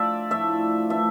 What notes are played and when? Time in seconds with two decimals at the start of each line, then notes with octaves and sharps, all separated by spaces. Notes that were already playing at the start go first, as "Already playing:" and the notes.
Already playing: F3 A3 D4 F4 D5 E5
0.31 A2 F3 A3 D4 E5
0.90 E3 A3 D4 E5